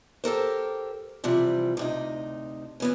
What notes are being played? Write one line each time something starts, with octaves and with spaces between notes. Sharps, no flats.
G4 A4 A#4 C5
C3 E3 F3 G3
D2 C3 D#4
E3 B3 C#4